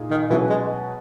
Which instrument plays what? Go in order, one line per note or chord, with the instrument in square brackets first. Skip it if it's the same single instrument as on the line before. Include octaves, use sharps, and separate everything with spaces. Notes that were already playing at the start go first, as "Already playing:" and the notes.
Already playing: [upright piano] A#2 A#3 D#4 G#4
[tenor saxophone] D#3
[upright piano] B2 F#3 C#4 G#4 B4 [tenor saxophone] E3
[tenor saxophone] G#3